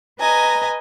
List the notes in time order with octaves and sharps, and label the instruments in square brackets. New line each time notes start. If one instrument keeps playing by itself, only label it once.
[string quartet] B4 D#5 G#5 A#5